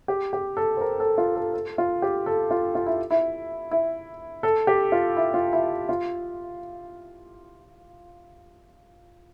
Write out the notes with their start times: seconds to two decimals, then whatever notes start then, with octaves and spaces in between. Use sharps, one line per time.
0.08 G4
0.33 G4
0.57 A4
0.77 C5
0.81 A#4
1.00 A4
1.18 F4
1.35 A4
1.54 A4
1.78 F4
2.02 G4
2.26 A4
2.51 F4
2.75 F4
2.86 E4
3.11 E4
3.71 E4
4.43 A4
4.67 G4
4.92 F4
5.17 E4
5.34 F4
5.53 E4
5.89 F4